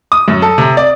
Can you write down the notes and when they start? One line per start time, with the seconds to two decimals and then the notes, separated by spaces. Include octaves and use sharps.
0.12 D#6
0.28 F#2
0.42 A4
0.58 C3
0.77 D5